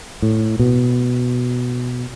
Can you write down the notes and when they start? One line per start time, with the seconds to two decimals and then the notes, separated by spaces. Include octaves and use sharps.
0.22 A2
0.59 B2